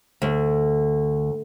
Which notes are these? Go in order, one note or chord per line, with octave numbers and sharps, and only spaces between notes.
D2